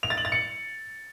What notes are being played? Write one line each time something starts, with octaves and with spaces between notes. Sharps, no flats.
F7
A6
F#7
A6
C#7